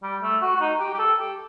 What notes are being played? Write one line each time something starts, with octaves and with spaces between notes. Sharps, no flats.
G3
A3
F#4
F#4
D#4
G4
G4
A4
G4